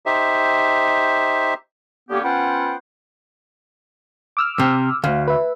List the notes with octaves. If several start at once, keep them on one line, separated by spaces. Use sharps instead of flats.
D#4 G4 C5 E5
D3 A#3 B3 C#4 G4
B3 C#4 F4 C5 F#5 G5
D6 E6 F6
C3
D2 F5
B4 E5